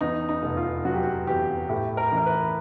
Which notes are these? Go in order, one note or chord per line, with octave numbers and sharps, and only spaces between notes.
E2 D#4
D#4
F1
F4
F#3 F#4
G4
F#4
E2 G4
A2 G4
A#4
E3 A#4
B4